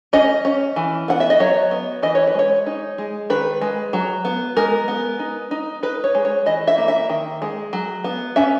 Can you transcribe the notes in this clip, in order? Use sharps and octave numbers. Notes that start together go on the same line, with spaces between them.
C#4 D#5
C#4
E3
B3 F#5
E5
D#5
F#3 C#5
B3
E3 D#5
C#5
B4
G#3 C#5
D#4
G#3
D#3 B4
G#3
F#3
B3
G#3 A#4
B3
D#4
D#4
D#4 B4
C#5
G#3
C#5
E3 D#5
E5
A#3
E5
D#3
G#3
F#3
B3
C#4 E5